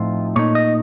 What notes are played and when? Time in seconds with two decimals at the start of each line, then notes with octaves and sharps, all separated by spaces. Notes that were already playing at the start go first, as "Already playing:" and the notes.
Already playing: A2 F3 C4 D#4 F4
0.36 A#2 A3 D#4 C#5
0.55 D#5